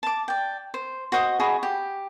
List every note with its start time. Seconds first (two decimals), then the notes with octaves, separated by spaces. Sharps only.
0.03 A5 D6
0.28 D5 G5
0.74 C5
1.12 F#4 C5 D#5 D#6
1.40 F#4 G#4 D#5 B5
1.63 G4